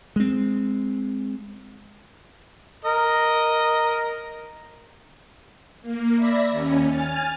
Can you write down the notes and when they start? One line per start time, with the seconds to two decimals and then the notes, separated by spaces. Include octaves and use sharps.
0.16 G#3 C4
2.85 A#4 D#5
5.82 A#3
6.16 D5 E5 B5 E6 A#6
6.50 D#2 C#4
6.89 G#5 F6 A6